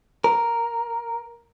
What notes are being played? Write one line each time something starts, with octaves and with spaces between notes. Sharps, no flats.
A#4